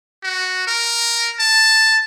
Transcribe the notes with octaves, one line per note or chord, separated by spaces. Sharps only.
F#4
A#4
A5